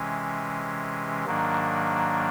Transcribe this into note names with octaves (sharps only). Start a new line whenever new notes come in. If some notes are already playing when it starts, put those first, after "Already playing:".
Already playing: C3 E3 G#3 C#4
G#2 D#3 F#3 A#3 D4